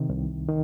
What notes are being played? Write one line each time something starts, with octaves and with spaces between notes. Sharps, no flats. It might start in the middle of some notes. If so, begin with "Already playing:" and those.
Already playing: C3 D#3
C2
D#3